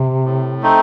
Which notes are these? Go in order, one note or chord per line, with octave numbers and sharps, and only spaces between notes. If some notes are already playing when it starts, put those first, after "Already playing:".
Already playing: C3
A2
A3 C4 D#4